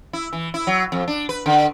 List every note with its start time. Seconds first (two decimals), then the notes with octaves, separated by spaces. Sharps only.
0.13 E4
0.33 E3
0.54 E4
0.67 F#3
0.92 F2
1.08 D4
1.29 B4
1.46 D3